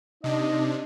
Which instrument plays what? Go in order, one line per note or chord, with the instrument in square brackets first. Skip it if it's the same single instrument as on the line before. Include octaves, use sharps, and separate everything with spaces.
[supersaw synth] C3 D4 [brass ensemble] D#4 D#5